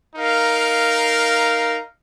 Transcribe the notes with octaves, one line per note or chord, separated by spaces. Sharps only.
D#4 A#4 F5